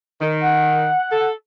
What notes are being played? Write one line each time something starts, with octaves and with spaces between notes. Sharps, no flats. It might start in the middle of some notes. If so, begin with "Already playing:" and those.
D#3
F#5
A4